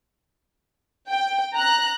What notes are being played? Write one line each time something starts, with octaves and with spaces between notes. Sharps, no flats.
G5
A#5 F#6